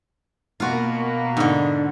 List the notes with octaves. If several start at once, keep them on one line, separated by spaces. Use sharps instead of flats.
B2 A#3 F4 F#4
G#2 D3